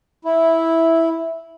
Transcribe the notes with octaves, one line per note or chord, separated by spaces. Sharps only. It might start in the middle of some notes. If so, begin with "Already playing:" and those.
E4